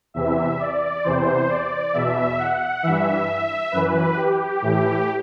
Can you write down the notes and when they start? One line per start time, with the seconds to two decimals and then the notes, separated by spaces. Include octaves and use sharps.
0.14 E2 C3 E3 E5
0.59 D5
1.04 E2 C3 E3 C5
1.49 D5
1.93 E2 B2 E5
2.38 F#5
2.83 G2 E3 E5
3.72 F#2 E3 B4
4.17 G4
4.62 A2 E3